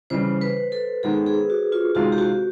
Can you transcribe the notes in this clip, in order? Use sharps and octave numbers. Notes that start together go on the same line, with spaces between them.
C#3 E3 G3 C5
B4
A4
D#3 G#3 B3 G#4
G#4
F#4
F4
C3 D#3 G#3 C4 F4 F#4
G4
F#4